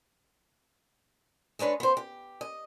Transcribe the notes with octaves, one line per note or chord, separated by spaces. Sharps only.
G#3 A3 D4 B4 C#5
B3 C5
G4
D#5